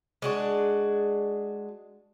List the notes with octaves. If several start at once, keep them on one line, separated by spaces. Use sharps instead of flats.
G#3 D4 F#4